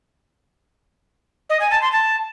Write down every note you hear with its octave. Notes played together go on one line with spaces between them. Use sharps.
D#5
G#5
A5
C6
A5